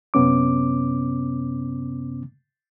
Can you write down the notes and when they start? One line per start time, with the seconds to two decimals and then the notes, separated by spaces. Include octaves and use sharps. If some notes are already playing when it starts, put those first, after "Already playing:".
0.14 F#2 C3 B3 C#4 D6